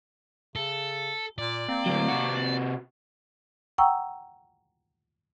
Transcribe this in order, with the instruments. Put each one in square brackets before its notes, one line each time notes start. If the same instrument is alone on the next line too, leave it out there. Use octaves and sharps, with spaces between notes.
[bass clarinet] C#3 [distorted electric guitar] A4
[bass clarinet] A#2 [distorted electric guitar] D5
[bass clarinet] A#3 [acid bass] C4
[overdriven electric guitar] D2 F#3
C3 F#4
[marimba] F#5 G5 A#5 C#6 D#6 E6